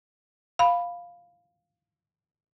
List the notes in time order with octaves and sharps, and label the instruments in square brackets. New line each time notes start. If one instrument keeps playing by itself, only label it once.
[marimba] F5 B5